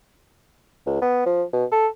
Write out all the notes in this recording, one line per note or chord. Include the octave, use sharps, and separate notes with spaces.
C#2
B3
F3
B2
A4